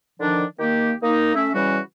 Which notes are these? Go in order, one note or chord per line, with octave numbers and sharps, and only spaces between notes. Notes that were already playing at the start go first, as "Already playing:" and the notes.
D3 D#3 F3 D4
D#3 A#3 G4
A#3 D#4
A3 C#4 E5
C#3 E3 G3 C#4 F#4 B4